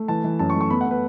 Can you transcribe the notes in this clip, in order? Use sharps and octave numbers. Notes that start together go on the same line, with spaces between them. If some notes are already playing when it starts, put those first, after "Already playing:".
Already playing: A3
E3 A5
E3
F#2 A5
C#6
A3
C#6
B3 B5
F#5
B3 B4